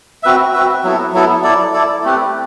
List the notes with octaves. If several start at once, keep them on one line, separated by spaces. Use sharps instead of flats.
C4 F#4 B4 E5
C4 F#4 B4 E5
F#3 B3 E4 A4
F#3 B3 E4 A4
E4 A4 D5
E4 A4 D5
A3 C4 G4 B4